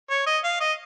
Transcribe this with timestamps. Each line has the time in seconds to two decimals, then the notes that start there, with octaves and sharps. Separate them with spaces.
0.10 C#5
0.26 D#5
0.44 F5
0.61 D#5